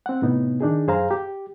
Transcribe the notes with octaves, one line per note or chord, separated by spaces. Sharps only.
C4 F#5
A2 C3 B3 D#4
D#3 D4 D#4 G#4
F#2 G#4 C5 F5 A#5
G4